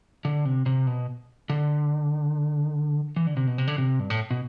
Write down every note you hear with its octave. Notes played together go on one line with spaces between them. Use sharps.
D3
C3
C3
B2
D3
E3
D3
C3
B2
C3
D3
C3
G2
A2
B2